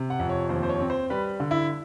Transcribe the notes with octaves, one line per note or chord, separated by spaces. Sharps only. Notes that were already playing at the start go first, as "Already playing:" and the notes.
Already playing: C3
F#5
F2
C#5
D#2 C5
C5
C#5
C4
C5
G3 B4
D3
E4